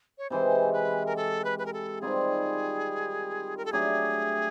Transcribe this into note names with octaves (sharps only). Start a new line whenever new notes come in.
C#5
C3 E3 G#3 C5
B4
A#4
A4
B4
B4
A#4
A4
D#3 G3 C4 F4 G#4
A#4
A4
F#3 A3 D4 G4 G#4